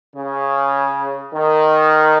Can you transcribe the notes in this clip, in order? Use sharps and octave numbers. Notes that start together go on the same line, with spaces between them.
C#3
D#3